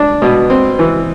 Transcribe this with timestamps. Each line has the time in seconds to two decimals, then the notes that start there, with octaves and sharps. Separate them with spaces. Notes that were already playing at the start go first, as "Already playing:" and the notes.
Already playing: D4
0.22 B2
0.50 C4
0.79 E3